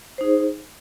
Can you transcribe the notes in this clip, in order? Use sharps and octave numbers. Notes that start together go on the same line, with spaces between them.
D#4 G#4 C5